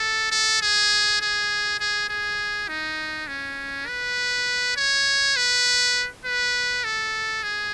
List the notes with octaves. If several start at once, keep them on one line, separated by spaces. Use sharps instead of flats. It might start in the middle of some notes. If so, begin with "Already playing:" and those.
Already playing: A4
A4
G#4
G#4
G#4
G#4
D#4
C#4
B4
C#5
B4
B4
A4
G#4